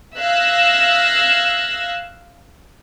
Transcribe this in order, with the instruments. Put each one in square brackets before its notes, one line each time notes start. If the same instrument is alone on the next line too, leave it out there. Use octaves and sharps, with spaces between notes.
[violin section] E5 F5 E6 F#6 G#6 A#6